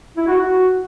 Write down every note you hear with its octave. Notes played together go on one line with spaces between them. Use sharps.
E4
F#4
F#4